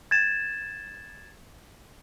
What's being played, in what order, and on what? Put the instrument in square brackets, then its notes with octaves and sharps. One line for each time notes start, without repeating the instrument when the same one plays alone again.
[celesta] G#6 A6 E7